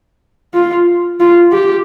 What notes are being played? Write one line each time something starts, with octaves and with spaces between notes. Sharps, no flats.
F4
F4
G4